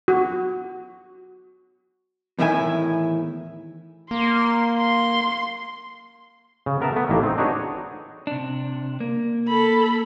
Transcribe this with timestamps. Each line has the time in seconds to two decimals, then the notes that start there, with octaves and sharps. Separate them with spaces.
0.08 F#4
2.39 E2 A2 D#3 E4 G#5
4.11 A#3 C6
4.79 C6
6.66 C#3
6.81 B3 A#4 E5 A5
6.93 A3 B3
7.09 A1 D#3 A3 A#3 A#4
7.23 C4 D#4
7.38 D4 D#4 F#4 G#4 B4 C#5
8.27 C3 D4
9.00 A#3
9.48 A4 B5